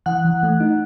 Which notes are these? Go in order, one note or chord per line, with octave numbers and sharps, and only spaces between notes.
E3 F#5 F#6
E3
A3
D#4